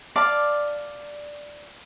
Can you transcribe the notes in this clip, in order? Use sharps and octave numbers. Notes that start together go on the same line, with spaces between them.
D5 F5 A5